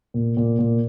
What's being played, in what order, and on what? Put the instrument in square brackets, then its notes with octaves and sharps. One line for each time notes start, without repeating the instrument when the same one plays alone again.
[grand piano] A#2
A#2
A#2